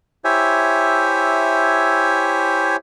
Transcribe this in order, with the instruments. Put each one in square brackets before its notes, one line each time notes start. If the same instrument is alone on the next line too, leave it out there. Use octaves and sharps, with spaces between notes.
[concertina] E4 G4 C5 C#5 E5 G#5